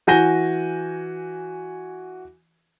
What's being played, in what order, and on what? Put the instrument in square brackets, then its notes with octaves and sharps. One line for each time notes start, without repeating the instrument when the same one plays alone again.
[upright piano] E3 F#4 G#5 G6 A#6 G7